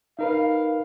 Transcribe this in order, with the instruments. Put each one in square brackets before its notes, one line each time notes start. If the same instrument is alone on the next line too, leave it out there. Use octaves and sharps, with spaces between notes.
[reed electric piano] D#4 A#4 B4 [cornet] F5